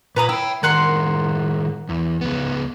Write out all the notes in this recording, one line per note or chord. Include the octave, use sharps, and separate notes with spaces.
A#2 B4 A#5 D#6
E4 C#5 G5
A2 D#3 A#4 F#5 C6
E2
C#2 B3